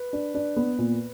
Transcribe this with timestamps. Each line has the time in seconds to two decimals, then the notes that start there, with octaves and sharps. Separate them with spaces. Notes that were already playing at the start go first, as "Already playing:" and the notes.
Already playing: B4
0.13 D4
0.35 D4
0.57 B3
0.78 A#2